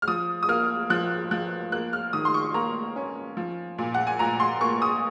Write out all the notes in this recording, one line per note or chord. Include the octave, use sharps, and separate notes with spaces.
F6
F3 D#6
D#6
A#3 F6
F3 F#6
F3 F#6
A#3 F#6
F6
D#3 D#6
C6
C#6
A#3 A#5
C#4
F3
A#2
F#5
G#5
A#2 A#5
C6
A#3 C#6
D#6